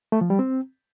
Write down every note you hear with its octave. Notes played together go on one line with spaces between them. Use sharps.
A3
F3
G3
C4